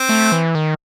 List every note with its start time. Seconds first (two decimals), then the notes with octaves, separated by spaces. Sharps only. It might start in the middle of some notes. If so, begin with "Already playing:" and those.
Already playing: C4
0.09 A3
0.32 E3
0.55 D#3